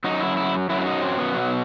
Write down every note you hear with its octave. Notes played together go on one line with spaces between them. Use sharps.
F#2 F#3 D#4
E4
E4
F#2 F#3 E4
E4
D#4
C4
B3
B2 F#3